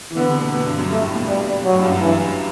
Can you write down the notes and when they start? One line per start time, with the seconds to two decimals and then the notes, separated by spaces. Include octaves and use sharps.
0.11 E3
0.16 D3 B3
0.29 C3
0.41 B2
0.54 B2
0.66 G2
0.78 F#2
0.90 G2 A3
1.03 A2
1.15 B2
1.27 B2 G3
1.65 F#3
1.73 A2
1.79 F#2
1.82 G2
1.92 F#2
2.01 G2 E3